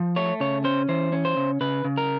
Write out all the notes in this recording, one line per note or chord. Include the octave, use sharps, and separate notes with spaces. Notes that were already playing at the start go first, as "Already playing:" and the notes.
Already playing: F3
A3 C#5
C#3 C#5
C#4 C5
E3 C5
C#4
C5
C#3
C#3 B4
C#3
A#4